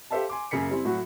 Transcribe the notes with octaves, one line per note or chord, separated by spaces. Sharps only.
G4 A4 C5 E5 F5 A5
G#5 C6 D6
F#2 C#3 A#3 B6 C#7
G3 C4 E4
A2 F#3 F#4